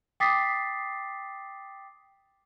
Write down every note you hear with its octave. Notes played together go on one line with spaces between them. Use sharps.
G5 D6 D#6 A6 B6 C7